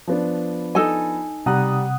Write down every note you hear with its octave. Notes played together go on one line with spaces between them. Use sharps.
F3 B3 D4
D#4 A4 G#5
C3 G3 F#5 A#5 D#6 F#6